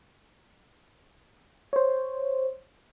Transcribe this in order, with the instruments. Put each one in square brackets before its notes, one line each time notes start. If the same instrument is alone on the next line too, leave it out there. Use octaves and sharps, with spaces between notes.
[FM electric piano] C5 C#5